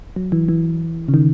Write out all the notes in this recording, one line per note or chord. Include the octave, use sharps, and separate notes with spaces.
F#3
E3
E3
C#3
D#3